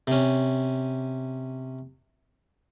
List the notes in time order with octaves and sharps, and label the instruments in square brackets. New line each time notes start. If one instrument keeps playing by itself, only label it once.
[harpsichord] C3 C#4